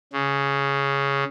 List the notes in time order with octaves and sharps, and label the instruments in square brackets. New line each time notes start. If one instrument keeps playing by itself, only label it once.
[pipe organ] C#3